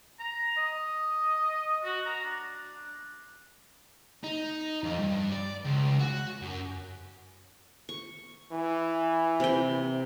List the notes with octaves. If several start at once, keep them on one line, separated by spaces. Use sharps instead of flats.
A#5
D#5
F#4
A#5
D4
D#4
F2
G2
D5
C#2
F#4
F#2
C#6
E3
C3 G5